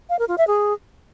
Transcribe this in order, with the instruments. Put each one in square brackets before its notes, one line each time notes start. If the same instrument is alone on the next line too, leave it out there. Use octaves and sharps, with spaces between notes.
[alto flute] F5
A#4
F4
E5
G#4